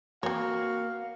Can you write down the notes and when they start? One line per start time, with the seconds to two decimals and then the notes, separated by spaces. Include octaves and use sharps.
0.23 A#3 C4 F#4 C#5 F5